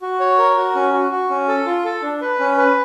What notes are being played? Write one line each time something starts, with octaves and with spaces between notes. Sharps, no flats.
F#4
C#5
A#4
F#4
C#4
F#4
F#4
C#4
A4
F4
A4
D4
B4
C#4
B4